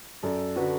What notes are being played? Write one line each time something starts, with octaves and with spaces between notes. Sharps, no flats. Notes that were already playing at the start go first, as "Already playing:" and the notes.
F#2 A4 D5
D3 F#3 F#4 B4